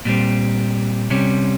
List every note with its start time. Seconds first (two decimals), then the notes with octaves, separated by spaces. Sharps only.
0.05 A#2 G3 C4
1.10 C3 G3 C#4